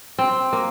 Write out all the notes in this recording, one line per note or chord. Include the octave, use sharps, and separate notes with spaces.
C4
A#3